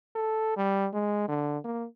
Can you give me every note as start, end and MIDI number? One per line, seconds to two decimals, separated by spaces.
0.15 0.53 69
0.57 0.88 55
0.94 1.27 56
1.28 1.58 50
1.64 1.86 58